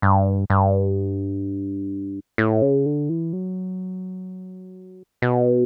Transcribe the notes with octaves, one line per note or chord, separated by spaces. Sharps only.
G2
G2
A2
C#3
D3
E3
F#3
B2